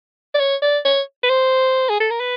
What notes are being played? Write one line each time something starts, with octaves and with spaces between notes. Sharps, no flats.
D5
C#5
D5
C#5
B4
C5
G#4
A4
A#4
B4